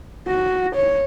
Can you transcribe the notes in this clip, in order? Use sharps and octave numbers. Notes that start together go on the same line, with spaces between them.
F#4
C#5